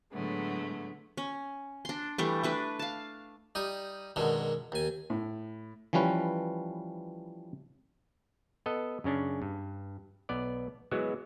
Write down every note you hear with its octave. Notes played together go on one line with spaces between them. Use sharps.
A2 D3 F#3 G#3 A3 B3
C#4
D4 C6
E3 G3 A3
A3 D4 B4
F5 A5
G3 D#4 D#6
F#2 B2 D3 D#3 G#3
D#2 G#5
A2
E3 F3 G3 C#4 B4
B3 A4 D#5
F#2 C#3 C#4 D4
G2
B1 B3 D5
E3 F#3 G#3 B3 F#4